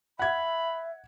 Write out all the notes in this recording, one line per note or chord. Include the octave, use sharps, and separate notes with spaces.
E5 F#5 B5 G#6